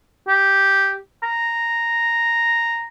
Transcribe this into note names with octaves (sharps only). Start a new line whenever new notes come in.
G4
A#5